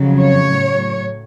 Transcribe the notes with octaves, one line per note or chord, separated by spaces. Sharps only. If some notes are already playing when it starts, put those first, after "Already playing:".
Already playing: F2 C#3 F#3
C#5
A2 F#3